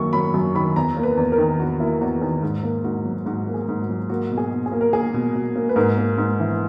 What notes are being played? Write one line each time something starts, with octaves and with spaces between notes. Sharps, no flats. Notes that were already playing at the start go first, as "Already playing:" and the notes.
Already playing: F#2 D#3 F#3 A#3 C#6
F#3 B5
F#2
D#3 B5
E2 A#5
A#3
B4
E2
A#4
D#3
E2 F#4
A#3 E4
E2 F#4
D#3 G#4
G#2
A#3
G#2 F#4
F#3
G#2 F#4
A#3
G#4
G#2
F#4
F#3
A#3 F#4
B2
G#4
B2
G#4
A#3
A#4
A#3 G#4
B2
B2
A#3
B4
G#2 A#4
A#3
G#2
E3